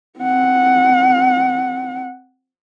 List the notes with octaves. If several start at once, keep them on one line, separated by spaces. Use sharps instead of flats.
C4 F#5